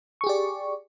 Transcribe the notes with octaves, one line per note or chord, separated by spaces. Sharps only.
G4 G#4 D5 C#6